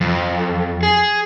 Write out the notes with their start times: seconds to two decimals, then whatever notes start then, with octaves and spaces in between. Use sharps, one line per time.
0.01 F2
0.83 G#4